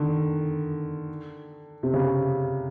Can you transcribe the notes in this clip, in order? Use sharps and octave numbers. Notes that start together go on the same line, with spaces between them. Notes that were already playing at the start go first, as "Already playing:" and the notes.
Already playing: D3 D#3
C3
C#3